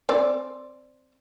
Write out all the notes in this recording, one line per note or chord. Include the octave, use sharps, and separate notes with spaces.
C4 D5